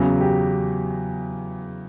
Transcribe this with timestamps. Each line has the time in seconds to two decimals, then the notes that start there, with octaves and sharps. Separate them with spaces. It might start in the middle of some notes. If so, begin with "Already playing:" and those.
Already playing: E2 C#3 F#3
0.21 G4